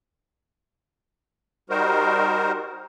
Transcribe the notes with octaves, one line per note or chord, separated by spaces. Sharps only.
G3 D#4 F#4 A#4 C5